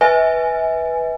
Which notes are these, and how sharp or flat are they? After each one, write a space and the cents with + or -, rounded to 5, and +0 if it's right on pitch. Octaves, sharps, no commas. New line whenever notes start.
B4 +0 E5 -35 G#5 +0